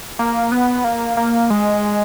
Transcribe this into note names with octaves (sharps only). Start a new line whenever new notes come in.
A#3
B3
A#3
A#3
G#3